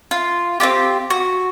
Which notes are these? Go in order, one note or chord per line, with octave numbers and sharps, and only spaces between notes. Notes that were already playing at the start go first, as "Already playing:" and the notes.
F4
C4 C#4 F4 G4
F#4